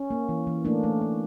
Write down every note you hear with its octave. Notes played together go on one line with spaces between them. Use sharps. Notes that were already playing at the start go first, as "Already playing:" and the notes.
Already playing: C#4
A#3
E3
E3
A3 A#3 D4
A3
A#3